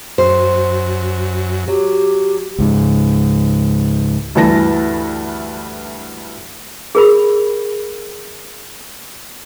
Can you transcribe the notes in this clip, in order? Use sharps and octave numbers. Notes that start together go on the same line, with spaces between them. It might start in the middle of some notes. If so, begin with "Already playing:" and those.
F#2 C5
F#3 G4
C#2 G#2
D2 G2 E3 A5 A#6
G#4 A#4 B5